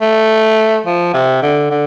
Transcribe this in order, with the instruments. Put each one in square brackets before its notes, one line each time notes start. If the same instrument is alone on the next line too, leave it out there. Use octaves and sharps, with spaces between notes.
[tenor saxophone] A3
F3
C3
D3
D3